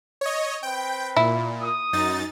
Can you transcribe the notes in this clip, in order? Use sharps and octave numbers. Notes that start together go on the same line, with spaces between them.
C#5 D#5
C4 B4 G5
A#2 E4
D#6
F#2 D#4 A6